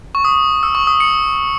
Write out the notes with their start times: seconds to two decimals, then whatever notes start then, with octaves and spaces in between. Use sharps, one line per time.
0.15 C#6
0.25 D#6
0.63 E6
0.75 C#6
0.87 D#6
1.00 C#7